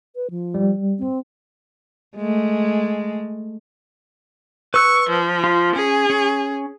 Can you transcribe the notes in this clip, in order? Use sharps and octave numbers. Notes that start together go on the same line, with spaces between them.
B4
F3
G3
C4
G#3 A3
B4 C#6 E6 F#6
F3
F4
C#4 G#4
C#4